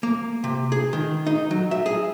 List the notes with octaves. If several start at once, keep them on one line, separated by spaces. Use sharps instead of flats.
A#3
C3
G#4
D#3
D#4
F#3
E5
G#4